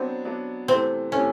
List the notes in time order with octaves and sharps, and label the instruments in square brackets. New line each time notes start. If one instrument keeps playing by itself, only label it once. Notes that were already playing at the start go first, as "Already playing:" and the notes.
Already playing: [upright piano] F#3 B3 D4 [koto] C4
[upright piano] F#3 B3 D4
[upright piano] C3 E3 A3 [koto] C4
[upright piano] C3 E3 A3 [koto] C#4